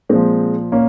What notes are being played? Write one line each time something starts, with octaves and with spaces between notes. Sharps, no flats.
A#2 F3 G#3 C4
A#2 A#3 C#4